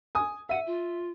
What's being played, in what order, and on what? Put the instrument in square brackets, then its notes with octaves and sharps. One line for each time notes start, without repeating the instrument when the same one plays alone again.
[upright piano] G#5 D#6
[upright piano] E5 D#7 [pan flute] F#5
[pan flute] F4